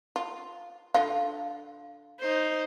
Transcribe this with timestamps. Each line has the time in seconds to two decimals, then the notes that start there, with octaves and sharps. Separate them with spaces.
0.16 F4
0.94 D3 F4 F5
2.19 D#4 C5